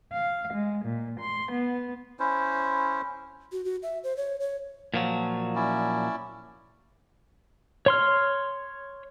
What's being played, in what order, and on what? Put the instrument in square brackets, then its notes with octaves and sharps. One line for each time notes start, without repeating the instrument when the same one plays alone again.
[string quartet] F5
G#3
A#2
C6
B3
[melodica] C#4 E4 C5
[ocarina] F#4
F#4
E5
C5
C#5
C#5
[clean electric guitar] A#2 F3 F#3
[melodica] C#4 E4 D5
[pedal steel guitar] C#5 C6 F6